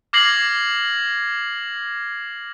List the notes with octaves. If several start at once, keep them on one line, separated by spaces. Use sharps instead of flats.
D6 F6 G#6 A#6 C7 F#7